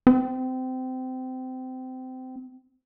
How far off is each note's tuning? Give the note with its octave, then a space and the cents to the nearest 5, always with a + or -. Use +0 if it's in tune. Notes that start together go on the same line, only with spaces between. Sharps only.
C4 -25